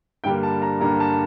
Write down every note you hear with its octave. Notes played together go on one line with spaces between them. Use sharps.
G2 D3 G3 A#3 G5
A5
A#5
G2 D3 G3 A#3 A#5
A5